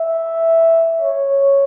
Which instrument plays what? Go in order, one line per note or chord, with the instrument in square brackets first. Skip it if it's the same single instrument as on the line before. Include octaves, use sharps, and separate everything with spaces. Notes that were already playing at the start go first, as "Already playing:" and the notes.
Already playing: [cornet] E5
C#5